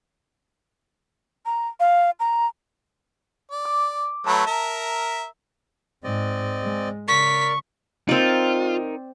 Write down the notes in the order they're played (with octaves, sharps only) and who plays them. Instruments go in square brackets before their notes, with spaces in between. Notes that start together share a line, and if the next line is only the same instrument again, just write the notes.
[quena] A#5
F5
A#5
[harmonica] D5
[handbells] D6
[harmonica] F#3 A3 B4 [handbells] A5
[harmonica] A#4 E5 A#5
[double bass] G#2 G#3 [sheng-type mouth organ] C4 D5 D#5
[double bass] G#3
[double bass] C#3 [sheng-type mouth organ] A#4 D5 [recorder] C#6 [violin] B6
[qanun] C4 D5 [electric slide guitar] D#4 A#4 [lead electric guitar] F4